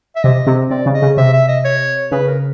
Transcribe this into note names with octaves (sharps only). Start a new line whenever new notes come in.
E5
C3 D#5
C3
C3 D5
C#3
D#5
C#3
C3 E5
E5
D#5
C#5
C#3 B4
A#4